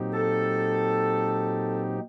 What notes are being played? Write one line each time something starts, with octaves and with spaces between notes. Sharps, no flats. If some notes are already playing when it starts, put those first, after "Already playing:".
Already playing: A#2 F#3 C4 D#4 G4
A4